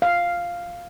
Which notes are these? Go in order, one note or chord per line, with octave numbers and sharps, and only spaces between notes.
F5